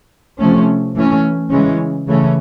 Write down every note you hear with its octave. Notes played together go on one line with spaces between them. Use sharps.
C3 F3 A3 C#4
E3 A3 C#4
C#3 E3 G#3 C#4
C#3 E3 A3 C#4